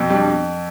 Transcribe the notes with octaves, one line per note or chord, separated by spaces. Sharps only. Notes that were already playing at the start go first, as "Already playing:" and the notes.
Already playing: F2 B2
G3 D4